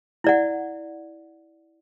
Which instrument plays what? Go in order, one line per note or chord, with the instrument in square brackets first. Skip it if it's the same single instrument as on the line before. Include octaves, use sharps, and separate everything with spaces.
[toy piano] E4 D5 F#5